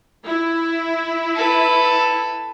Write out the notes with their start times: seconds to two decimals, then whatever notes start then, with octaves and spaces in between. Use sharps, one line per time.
0.24 E4
1.35 A4 B4